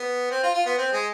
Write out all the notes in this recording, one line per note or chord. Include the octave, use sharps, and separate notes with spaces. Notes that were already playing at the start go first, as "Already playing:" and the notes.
Already playing: B3
C4
F4
F4
B3
C4
G#3